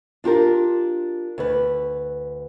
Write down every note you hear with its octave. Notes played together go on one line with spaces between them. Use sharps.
D4 F4 G4 A#4
D2 B4